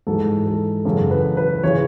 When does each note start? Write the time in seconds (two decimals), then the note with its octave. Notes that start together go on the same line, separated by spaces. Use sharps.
0.07 G#2 E3 A4
0.46 A4
0.85 F#2 C#3 E3 A4
1.11 B4
1.37 B4
1.63 C#3 E3 C#5